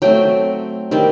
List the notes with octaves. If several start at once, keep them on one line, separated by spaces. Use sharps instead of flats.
F#3 A3 C4 G5
D#3 G3 C4